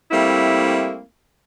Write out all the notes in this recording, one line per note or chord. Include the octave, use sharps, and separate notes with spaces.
G3 A3 A#3 C4 E4